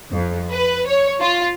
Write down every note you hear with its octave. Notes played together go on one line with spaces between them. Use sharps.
F2
B4
C#5
F4